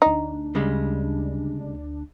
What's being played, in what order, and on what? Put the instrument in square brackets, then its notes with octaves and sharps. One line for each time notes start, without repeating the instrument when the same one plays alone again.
[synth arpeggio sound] D2 D4 [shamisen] D#4
[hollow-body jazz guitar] C#3 G3 G#3